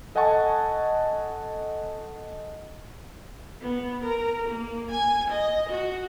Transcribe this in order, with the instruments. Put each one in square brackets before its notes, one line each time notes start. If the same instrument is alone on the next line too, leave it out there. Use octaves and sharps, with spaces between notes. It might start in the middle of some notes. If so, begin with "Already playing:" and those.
[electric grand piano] A4 D#5 F#5 G#5 A5 C#6
[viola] B3
A#4
A#3
G#5
D#5
F#4